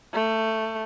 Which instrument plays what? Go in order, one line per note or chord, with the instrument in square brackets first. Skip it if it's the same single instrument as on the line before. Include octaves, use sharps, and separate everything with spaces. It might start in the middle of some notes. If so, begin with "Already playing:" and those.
[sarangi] A3